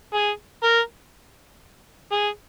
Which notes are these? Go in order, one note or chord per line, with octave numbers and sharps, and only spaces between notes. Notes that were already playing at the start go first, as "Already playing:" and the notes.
G#4
A#4
G#4